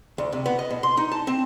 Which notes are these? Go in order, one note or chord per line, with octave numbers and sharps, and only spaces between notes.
D2
C3
B3
D#5
B2
C6
D#4
A5
C4